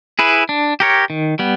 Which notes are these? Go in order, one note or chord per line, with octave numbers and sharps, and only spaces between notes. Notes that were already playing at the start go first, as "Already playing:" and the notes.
E4 G#4 B4
D4
G4 A#4 C#5
D#3
G3 B3